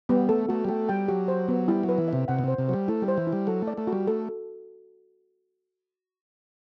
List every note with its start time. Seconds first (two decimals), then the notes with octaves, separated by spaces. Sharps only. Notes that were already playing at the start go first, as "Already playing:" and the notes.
0.09 G3 B3
0.29 A3 A4
0.49 A3 F#4
0.64 G3
0.68 A3 G5
0.89 G3 G5
1.08 F#3 G4
1.28 C5
1.48 B3
1.68 G3 E4
1.83 F#3
1.89 B4
1.98 E3
2.08 C3 E5
2.28 C3 F#5
2.39 B2
2.44 C3 C5
2.58 C3
2.68 F#3 C5
2.73 G3
2.88 A3 E4
3.02 G3
3.08 C5
3.18 E3
3.27 E4
3.33 G3
3.47 F#3 A4
3.62 A3
3.67 D5
3.78 A3
3.87 F#4
3.93 G3
4.07 A3 A4